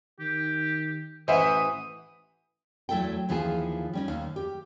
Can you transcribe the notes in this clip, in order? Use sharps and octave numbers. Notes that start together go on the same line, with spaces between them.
D#3 G4
A1 E3 C5 E5 F#5 D#6
E2 F#3 A3 E4 A4 G5
D#2 E3 F3 F4 G#4
G3 C#4 D#4
D#2 F5
G4